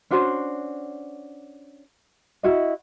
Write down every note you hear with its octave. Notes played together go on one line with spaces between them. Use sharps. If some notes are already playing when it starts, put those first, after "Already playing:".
C#4 D4 F#4 C5
E4 F#4 D#5